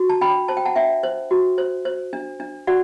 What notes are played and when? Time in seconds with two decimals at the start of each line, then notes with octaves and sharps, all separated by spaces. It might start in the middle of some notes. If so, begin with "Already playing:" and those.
Already playing: F#4
0.09 A5
0.21 D4 G5 B5
0.48 C5 A5
0.57 G5
0.65 F#5 A5
0.76 D4 E5 G5
1.03 C5
1.31 F#4
1.58 C5
1.85 C5
2.13 D4
2.40 D4
2.67 F#4 D5 F#5